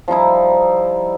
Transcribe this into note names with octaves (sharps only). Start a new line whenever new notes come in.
F3 G3 D#4 E4